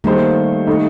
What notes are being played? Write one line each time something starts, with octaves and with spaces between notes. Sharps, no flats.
D#3 G3 A3 A#3 D#4 A4 C5
D#3 A3 D#4